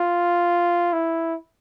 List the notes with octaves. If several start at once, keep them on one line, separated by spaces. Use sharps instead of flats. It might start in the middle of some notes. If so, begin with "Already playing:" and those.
Already playing: F4
E4